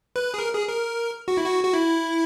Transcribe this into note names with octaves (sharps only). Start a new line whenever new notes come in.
B4
G#4
A#4
G#4
A#4
F#4
E4
F#4
F#4
E4